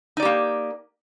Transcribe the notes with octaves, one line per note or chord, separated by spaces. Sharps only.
A#3 D#4 G4 D5